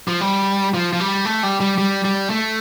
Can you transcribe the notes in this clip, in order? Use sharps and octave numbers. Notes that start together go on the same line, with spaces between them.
F3
G3
F3
F3
G3
A3
G3
G3
G3
G3
A3